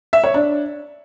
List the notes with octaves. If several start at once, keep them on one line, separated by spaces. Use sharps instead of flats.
E5
C#5
D4